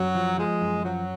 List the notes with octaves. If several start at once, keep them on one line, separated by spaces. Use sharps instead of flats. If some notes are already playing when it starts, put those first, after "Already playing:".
Already playing: F#2 F#3
F3
F3 G#3
F#2
F3 F#3